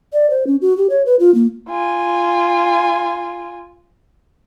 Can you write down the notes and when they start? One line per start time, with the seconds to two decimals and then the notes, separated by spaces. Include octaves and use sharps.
0.13 D5
0.30 C5
0.47 C#4
0.62 F#4
0.77 G4
0.90 C#5
1.06 B4
1.20 F4
1.35 A#3
1.70 F4 G#5